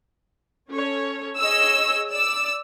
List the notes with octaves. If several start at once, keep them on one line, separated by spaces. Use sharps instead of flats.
C#4 A4 C#5
G#4 C#5 D#5 E6
D5 E6